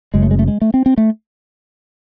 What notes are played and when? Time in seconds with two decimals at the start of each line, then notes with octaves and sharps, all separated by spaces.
0.14 F#1 F#2 C#3 G#3
0.22 A3
0.31 G#3
0.39 A3
0.48 G#3
0.61 A3
0.74 C4
0.86 C4
0.97 A3